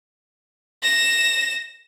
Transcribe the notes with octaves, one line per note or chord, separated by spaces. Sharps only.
A#6 E7